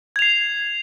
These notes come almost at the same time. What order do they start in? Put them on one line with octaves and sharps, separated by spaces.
G#6 F7 C7